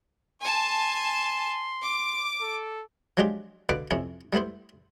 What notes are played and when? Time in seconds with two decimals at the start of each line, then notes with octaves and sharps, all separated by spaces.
0.42 G#5 A5 C6
1.81 D6
2.40 A4
3.17 F3 F#3 G#3 D4 F4 G4
3.69 B2 D3 B4 F5 D6
3.91 F2 C3 C#4 E4
4.33 G3 A3 B3 E4 C5